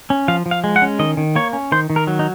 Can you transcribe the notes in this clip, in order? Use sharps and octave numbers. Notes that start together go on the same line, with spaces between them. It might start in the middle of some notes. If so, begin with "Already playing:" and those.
C#4
F3 F5
F3
F5
G#3
F#5
C#4
D#3 D#5
D#3
A#3 C#5
C#4
D#3 C5
D#3
A#4
F#3
D#4